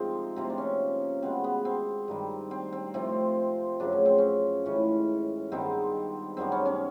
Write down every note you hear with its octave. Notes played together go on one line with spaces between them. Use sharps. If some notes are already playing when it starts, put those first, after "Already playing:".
Already playing: C3 F3 G#3 C4 D#4
C3 F3 A#3 C4
D4
C#4
B2 G#3 B3 C4
B3
C4
G2 D#3 G3
C4
C4
C3 F3 A3 C4
F#2 C#3 F3 A3 D4
C#4
C4
C#4
A2 E3 G#3 C#4
G2 D#3 G#3 B3 C4
F#2 D#3 G3 B3 C4
C#4
C#4